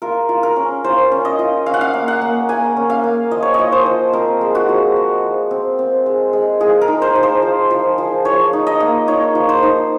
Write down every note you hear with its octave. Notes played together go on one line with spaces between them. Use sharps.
F4 A#4
F4
A#4
C#4
F4 C5
C#4
D#5
F4
C#4 F5
F#5
F5
A#3
F#5
A#3
A#3 G#5
C#4
F5
A#3
F3 D#5
C#5
F3 D#5
C5
F3
C4 A#4
G#3
F#4
F3
G#3
F3
C4
C4
G#3
G#3
F3 G#4
A#4
D#4
C5
F3
C5
F3
F3
F3
F3 C#5
D#4
D#5
A#3
D#4 C#5
F3
C5
D#4